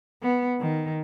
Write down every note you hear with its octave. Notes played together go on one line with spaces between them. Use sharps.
B3
D#3